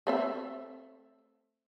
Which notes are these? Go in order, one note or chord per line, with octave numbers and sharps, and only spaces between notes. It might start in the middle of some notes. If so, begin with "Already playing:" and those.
A3 C4 E5